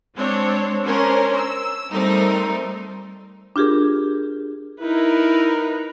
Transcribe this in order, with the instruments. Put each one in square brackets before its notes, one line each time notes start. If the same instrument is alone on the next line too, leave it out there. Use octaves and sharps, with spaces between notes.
[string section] G#3 C4 D4 C5 C#5
C#4 D4 A#4 C5 C#5
E6
G3 A3 C4 D#4 A#4 C5
[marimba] D4 F4 G4 G#4 A#4
[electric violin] D#4 B4 [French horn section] E4 [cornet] A#4